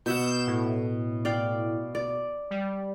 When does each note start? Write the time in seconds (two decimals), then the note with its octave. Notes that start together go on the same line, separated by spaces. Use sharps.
0.06 B2 E5 F#5 G6 E7
0.47 A2
1.25 D5 F5 G5
1.95 D5
2.51 G3